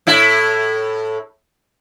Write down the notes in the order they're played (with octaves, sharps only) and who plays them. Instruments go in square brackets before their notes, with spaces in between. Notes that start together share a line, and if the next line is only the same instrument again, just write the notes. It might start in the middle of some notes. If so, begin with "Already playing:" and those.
[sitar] A2 E4